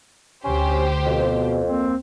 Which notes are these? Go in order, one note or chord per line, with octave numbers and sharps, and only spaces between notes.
D2 C#4 G4 C5
F2 B2
A#3 C4